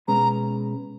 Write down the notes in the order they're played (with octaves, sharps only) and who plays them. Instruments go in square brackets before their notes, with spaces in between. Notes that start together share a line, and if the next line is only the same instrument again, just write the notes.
[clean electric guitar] B2 G#3 C#4 G#4 B4 [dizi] A#5